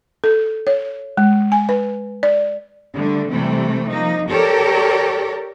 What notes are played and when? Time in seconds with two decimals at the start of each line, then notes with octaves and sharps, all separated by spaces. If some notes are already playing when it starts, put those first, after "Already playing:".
0.24 A4
0.67 C#5
1.17 G#3
1.52 G#5
1.69 B4
2.23 D5
2.93 D3 G3 A3
3.30 C3 E3 G3 A3 C4
3.89 F3 A#3 D#4
4.30 G4 A4 A#4 C#5 D5